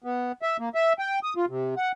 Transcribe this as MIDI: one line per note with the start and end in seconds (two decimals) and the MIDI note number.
0.04 0.32 59
0.42 0.57 76
0.59 0.69 58
0.75 0.93 76
0.99 1.19 79
1.23 1.34 87
1.36 1.45 65
1.49 1.74 48
1.77 1.92 78